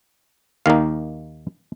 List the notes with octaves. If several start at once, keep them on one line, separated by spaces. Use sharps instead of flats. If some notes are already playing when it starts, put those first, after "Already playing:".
D#2 D#3 A#3 D#4 F5